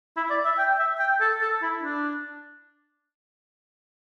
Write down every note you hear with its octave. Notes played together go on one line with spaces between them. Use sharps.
E4
D5
E5
G5
E5
G5
A4
A4
E4
D4